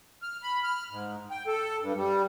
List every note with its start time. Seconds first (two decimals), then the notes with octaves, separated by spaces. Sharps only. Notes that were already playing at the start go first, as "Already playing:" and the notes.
0.22 F6
0.43 B5
0.63 F6
0.91 G#2
1.31 G5
1.47 A4
1.81 G2
1.96 G3